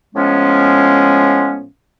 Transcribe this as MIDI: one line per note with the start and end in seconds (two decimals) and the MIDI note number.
0.15 1.65 45
0.15 1.65 53
0.15 1.65 56
0.15 1.65 59
0.15 1.65 61